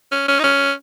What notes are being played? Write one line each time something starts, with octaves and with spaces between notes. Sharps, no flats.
C#4
C#4
D#4
C#4